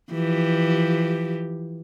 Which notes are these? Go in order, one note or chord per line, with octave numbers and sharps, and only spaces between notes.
E3 F3 G4